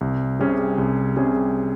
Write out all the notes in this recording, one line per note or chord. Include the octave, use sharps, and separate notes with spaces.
C2
C3 G3 C#4 G#4
C2
C3 G3 C#4 G#4